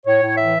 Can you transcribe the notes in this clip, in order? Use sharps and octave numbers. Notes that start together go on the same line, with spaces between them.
A2 C#5
A2
E3 E5